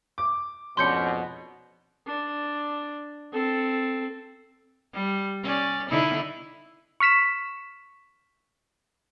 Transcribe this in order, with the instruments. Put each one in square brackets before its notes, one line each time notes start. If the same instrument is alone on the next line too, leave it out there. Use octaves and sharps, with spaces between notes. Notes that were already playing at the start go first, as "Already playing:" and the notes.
[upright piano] D6
[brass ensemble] F2 G#2 B2 [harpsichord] C#4 D4 [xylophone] C6 G6 C#7
[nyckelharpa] D4
C4 A4
[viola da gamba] G3
C#4 D5
D3 D#4 E4
[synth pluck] C#6 F6 B6 E7